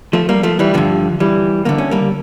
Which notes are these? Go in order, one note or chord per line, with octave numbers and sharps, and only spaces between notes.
F3 A3
G3 A#3
F3 A3
E3 G3
G2 D3 F3
E3 G3
D2 D3 A#3
C#4
G3 A#3